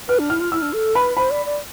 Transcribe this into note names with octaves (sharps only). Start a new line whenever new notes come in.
B4 F6
D4
E4 F6
F4
E4 E6
D4
A4
B4 B5
C5 B5
D5
D5